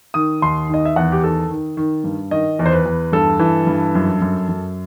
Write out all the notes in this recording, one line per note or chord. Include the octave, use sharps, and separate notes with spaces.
D#3 D#6
D#2 C6
D#3 D#5
E5
E2 F#5
G4
D#3 A4
D#3
D#3
G2
D#3 D#5
E2
C5
B4
E2
G2 A4
E3
G2
F#2
F#2
F#2